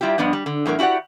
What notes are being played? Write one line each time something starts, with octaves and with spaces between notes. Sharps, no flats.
G3 E4 F4 G4
G2 F3 B3 D4 D#5
G3
D3
E2 A2 F#3 A#4
E4 F#4 G4 D5 F#5